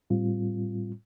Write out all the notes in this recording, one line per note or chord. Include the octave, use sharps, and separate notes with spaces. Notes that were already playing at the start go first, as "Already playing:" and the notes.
A2 G3 C4 F4